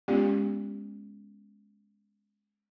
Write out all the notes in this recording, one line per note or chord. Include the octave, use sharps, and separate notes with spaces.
G#3 B3 C#4 F4 G4